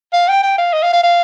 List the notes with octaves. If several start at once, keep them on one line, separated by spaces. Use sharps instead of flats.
F5
G5
G5
F5
D#5
F5
F5
F5